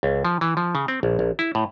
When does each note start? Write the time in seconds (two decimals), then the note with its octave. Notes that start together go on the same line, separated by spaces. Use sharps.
0.03 C#2
0.25 F3
0.41 E3
0.57 F3
0.75 C#3
0.88 C4
1.03 A#1
1.19 A#1
1.39 E4
1.55 A2